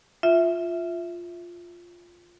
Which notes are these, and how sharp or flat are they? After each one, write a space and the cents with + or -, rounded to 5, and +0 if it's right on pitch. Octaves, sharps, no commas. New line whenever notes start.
F4 +0 E5 +0